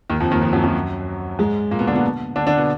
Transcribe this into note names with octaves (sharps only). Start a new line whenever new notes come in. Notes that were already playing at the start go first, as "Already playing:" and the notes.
D#2 D#3
F2 F3
D#2 D#3
F2 F3
F#2 F#3
F#2 F#3
G#2 G#3
A#2 A#3
B2 B3
D3 D4
B2 B3
D3 D4
D3 D4
B2 B3